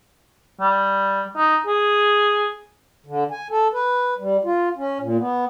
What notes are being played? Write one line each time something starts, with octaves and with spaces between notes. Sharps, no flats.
G3
D#4
G#4
D3
G#5
A4
B4
G3
F4
C#4
A#2
B3